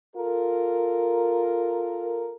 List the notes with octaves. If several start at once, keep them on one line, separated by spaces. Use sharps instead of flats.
F4 A4 A#4